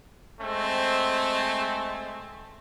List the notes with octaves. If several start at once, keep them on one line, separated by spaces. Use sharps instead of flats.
G#3 A3 C4